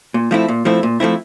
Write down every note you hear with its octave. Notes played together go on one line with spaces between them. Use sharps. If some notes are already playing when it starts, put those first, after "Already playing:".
A#2
F3 A3 C4 E4
A#2
F3 A3 C4 E4
A#2
F3 A3 C4 E4